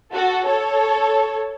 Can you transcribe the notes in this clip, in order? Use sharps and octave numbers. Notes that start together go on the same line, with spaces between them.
F#4 A4
A4 C#5